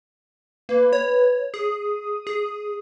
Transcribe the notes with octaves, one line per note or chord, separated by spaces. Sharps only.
A#3 B4
C#5
G#4 D#6
G#4